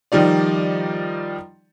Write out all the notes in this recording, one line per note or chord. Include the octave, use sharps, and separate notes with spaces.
D#3 F3 G3 D#4 D5